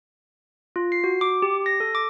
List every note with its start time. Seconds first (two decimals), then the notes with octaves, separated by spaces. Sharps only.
0.76 F4
0.92 C7
1.04 F#4
1.21 D6
1.42 G4
1.66 A#6
1.80 A4
1.95 D6